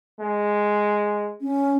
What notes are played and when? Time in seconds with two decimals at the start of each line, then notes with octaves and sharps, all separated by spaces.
0.20 G#3
1.41 C#4